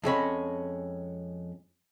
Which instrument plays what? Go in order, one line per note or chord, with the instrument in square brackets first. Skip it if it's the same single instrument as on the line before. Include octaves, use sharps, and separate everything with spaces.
[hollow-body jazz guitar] F2 G#3 C#4 B5